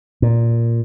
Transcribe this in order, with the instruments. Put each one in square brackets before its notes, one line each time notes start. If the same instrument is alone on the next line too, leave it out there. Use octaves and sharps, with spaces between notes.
[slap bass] A#2